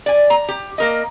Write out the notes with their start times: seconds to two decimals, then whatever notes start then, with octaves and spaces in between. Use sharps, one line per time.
0.06 D5 G#5
0.30 A#5
0.49 G4
0.78 A#3 A#4 D#5